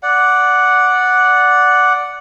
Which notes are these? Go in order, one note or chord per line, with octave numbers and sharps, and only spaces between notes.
D5 F#5